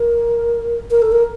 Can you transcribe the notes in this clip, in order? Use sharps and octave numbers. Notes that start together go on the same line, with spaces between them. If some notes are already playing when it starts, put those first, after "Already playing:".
Already playing: A#4
A#4
A4
A#4